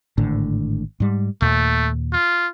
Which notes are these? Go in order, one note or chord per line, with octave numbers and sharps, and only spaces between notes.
G#1 A2 D3
G#2 G3
D#2 A#2 A3
F4